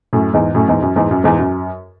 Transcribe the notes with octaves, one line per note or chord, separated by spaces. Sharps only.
F#2 A2
E2 G#2
F#2 A2
E2 G#2
F#2
E2 G#2
F#2
E2 G#2
F#2